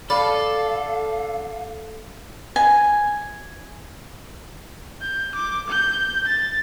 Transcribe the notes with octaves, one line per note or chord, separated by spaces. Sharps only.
A4 D5 F5 B5
G#5
G6
D6
G6
A6